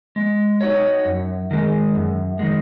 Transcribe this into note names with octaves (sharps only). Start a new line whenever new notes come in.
G#3
D#4 F#4 C#5
F#2
D#3 G#3
F#2
D#3 G#3